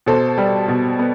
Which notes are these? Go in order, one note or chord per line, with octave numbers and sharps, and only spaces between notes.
B2 A4 C5
G3
B2
B3